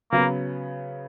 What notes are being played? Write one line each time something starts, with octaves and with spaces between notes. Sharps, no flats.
C#3 F#3 A#3 B3